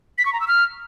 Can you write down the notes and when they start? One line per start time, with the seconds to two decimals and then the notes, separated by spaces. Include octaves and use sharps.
0.18 B6
0.26 C#6
0.33 A#5
0.40 E6
0.48 F6